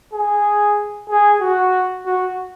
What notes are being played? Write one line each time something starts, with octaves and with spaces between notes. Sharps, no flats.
G#4
G#4
F#4
F#4